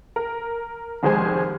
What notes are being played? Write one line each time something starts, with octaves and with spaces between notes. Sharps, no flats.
A#4
F1 D#2 G#3 G4 C5 G#5